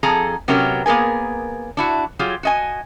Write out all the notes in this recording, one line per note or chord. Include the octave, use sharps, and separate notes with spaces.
F2 G#4 A4 A#5
C3 F#3 B3 C#4 G4 A#4
A#3 B3 G#4 A#4 G#5
D4 E4 F#4
F#3 F4 G4 G#4
F#4 D#5 G#5